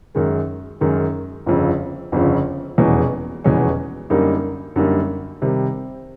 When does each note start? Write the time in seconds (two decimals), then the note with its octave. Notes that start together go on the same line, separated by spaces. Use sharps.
0.15 F#2 D#3 G#3
0.81 F#2 D#3 G#3
1.46 G1 F2 C#3
2.12 G1 F2 C#3
2.78 F1 E2 B2 G#3 C#4
3.44 F1 E2 B2 G#3 C#4
4.10 F#2 D3 G3 A#3 D#4
4.76 F#2 D3 G3 A#3 D#4
5.42 C3 D#3 G3